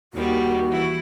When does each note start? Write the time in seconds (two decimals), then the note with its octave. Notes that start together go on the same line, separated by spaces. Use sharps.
0.14 D#2 D#3 G3 F#4
0.69 E3 E4